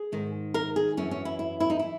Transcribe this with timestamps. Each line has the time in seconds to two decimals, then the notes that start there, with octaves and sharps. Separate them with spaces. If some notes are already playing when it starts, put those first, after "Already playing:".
Already playing: G#4
0.12 G#2 D#3
0.54 A#4
0.76 G#4
0.97 F#2 E3 C#4
1.11 C#4
1.25 E4
1.39 E4
1.60 E4
1.70 D#4
1.79 E3 E4